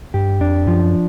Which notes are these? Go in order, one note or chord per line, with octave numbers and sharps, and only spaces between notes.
G2 G4
F2 D4
F#2 F3